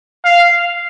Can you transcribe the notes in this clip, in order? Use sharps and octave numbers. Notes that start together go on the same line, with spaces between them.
F5